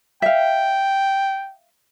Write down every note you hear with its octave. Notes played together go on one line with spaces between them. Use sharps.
E5 F5 G5